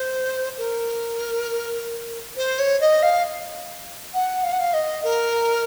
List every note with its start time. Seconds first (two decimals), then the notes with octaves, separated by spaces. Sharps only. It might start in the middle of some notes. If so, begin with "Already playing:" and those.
Already playing: C5
0.58 A#4
2.37 C5
2.59 C#5
2.80 D#5
3.02 F5
4.14 F#5
4.43 F5
4.52 F#5
4.59 F5
4.73 D#5
5.04 A#4